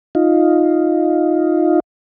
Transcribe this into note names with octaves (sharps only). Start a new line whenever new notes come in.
D#4 F4